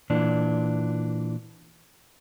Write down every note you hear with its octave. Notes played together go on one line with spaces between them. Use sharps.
A#2 E3 D4